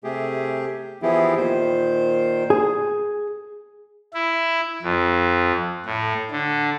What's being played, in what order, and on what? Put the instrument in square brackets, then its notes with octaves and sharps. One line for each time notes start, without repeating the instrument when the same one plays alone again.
[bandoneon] C3 A3 G4 G#4
E3 F3 B3 E4 G4 G#4
A#2 D#3 C5
[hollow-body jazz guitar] G#4
[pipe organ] E4
F2
A2
D3